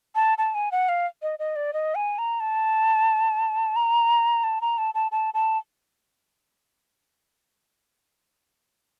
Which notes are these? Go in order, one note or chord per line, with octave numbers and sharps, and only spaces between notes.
A5
A5
G#5
F#5
F5
D#5
D#5
D5
D#5
G#5
A#5
A5
A#5
A5
A#5
A5
A5
A5
A5